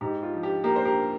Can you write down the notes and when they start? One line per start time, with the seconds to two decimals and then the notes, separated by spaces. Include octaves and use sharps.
0.01 G#2 G4
0.23 F4
0.33 F3
0.43 G4
0.64 A#3 G4 A#4
0.76 C5
0.85 G4 A#4